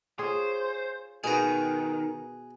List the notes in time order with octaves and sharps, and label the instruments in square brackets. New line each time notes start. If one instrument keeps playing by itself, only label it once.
[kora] F4 G#4 C#5 [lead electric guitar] C5
[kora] B2 B4 F#5 [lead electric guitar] D#3 [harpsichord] G#4 A#5